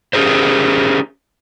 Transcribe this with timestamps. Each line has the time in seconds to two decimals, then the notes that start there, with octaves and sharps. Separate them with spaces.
0.13 C#4 G4 G#4 A#4 C5